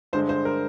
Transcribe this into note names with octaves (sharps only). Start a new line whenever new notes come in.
G2 D3 G#3 C5
C5
A#4